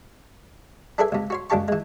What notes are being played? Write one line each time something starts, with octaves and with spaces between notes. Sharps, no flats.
D4 G#4 A4 B4 E5 G#5
C#2 C3
F#4 C#5 C6
C#2 F#2 D4 G4 A5 C#6
E3 G#3